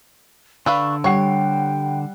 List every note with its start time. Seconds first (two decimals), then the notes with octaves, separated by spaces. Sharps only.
0.66 D3 D4 B4 F5 C#6 E6
1.04 G3 C#5 F#5 G5 C7